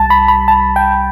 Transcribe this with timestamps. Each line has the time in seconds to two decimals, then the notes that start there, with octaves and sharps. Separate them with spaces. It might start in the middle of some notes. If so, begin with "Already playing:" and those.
Already playing: C2 G3 A5
0.10 B5
0.28 B5
0.48 A5
0.76 G5